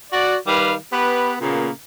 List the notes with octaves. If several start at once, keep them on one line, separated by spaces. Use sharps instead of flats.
F#4 D5
D#3 G3 B4 F5
B3 G4 B4
A#2 C#3 A#3 B3